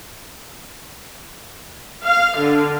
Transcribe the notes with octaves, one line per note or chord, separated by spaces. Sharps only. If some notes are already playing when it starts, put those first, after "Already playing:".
F5
D3